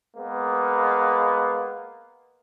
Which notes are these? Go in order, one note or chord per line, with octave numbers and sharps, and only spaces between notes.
G#3 A#3 B3